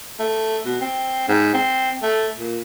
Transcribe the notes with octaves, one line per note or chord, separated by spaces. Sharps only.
A3
B2
C4
G#2
C4
A3
A#2